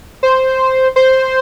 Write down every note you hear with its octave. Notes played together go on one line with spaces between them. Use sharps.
C5
C5